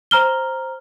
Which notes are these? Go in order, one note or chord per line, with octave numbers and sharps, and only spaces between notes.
C5 A#5 F6 G7